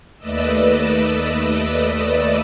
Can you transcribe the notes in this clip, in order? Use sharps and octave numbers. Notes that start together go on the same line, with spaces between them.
D#2 A3 B4 D5 D#5 E6